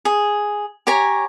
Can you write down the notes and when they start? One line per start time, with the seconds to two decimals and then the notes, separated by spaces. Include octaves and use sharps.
0.05 G#4
0.87 G4 C#5 G#5 A#5